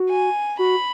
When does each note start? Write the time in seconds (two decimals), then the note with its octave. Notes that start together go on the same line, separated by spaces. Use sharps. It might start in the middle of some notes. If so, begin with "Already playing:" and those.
Already playing: F#4
0.11 G#5
0.59 F#4 B5